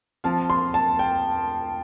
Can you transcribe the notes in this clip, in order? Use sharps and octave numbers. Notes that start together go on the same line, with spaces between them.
F3 C4 F4 A5
C6
A5
G5